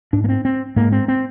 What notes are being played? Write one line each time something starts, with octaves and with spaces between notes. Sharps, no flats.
G#2 D4
A#3
C4
C4
G#2 A#3
C4
C4